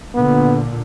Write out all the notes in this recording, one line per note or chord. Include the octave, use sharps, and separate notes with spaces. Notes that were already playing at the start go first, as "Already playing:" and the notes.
A#2 D3 B3